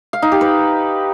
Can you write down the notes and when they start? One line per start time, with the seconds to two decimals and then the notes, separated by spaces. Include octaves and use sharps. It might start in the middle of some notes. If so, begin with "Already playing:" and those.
0.13 F5
0.22 D#4
0.32 G4
0.41 B4